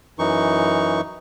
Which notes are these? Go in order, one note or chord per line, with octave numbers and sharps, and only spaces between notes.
F#2 E3 D#4 C#6